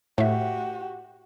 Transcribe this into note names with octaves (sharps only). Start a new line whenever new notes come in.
A2 A3 F#4 G4 E5